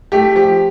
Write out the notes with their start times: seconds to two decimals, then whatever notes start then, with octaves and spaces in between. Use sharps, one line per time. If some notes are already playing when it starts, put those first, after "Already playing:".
0.12 A3 G4
0.35 F3 G4